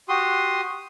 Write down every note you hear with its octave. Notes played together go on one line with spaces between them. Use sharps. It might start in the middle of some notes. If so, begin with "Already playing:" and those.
F#4 G4 C6 D#6